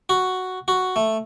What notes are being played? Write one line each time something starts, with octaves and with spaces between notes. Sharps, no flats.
F#4
F#4
A3